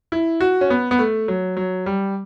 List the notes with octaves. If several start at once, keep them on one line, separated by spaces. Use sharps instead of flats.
E4
F#4
C#4
B3
B3
A3
F#3
F#3
G3